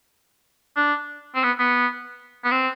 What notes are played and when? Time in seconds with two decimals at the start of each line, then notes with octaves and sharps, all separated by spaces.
0.77 D4
1.35 C4
1.43 B3
1.59 B3
2.44 B3
2.51 C4